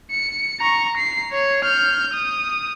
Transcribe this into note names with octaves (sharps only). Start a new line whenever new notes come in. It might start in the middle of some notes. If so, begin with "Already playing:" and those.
C#7
A#5 C#6
C7
C#5
F6 G6
D#6